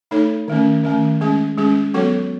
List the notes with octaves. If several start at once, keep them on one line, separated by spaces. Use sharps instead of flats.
A3 D#4 A4 C#5
D#3 A3 C#4
D#3 A3 C#4
G#3 C#4 G#4
G#3 C#4 G#4
F#3 B3 F#4 A4 C#5